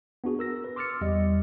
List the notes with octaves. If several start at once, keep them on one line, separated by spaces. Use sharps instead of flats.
B3 D4 F#4 G#4
A#4 E6 A#6
B4
C6 D6 E6 F6 A6 C#7
E2 G3 D#5